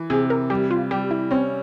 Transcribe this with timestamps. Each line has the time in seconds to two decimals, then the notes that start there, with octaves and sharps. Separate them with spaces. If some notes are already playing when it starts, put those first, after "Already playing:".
Already playing: E3
0.10 C3 G#4
0.30 A#4
0.50 G3 G4
0.71 F4
0.91 G3 G4
1.11 E4
1.31 C4 C#4